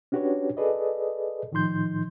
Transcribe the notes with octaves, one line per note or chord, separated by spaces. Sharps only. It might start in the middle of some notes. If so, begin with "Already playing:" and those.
C#4 D4 F#4 G4 B4 C#5
G#4 A4 B4 D5 D#5
A2 D#3 F3 D#4 C6 G6